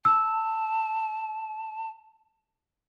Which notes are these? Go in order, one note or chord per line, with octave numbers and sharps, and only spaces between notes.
A5 E6